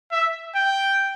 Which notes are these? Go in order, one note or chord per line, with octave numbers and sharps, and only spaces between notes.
E5
G5